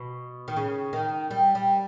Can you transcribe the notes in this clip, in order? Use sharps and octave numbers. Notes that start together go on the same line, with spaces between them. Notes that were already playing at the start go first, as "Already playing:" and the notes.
Already playing: B2
D#3
C#3
D#3
G3
G3